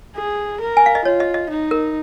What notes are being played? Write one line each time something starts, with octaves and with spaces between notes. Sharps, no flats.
G#4
A#4
G#5
F5
D#5
F4 C#5
D#5
D#5
D#4
A#4